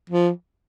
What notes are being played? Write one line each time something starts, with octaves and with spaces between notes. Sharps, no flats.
F3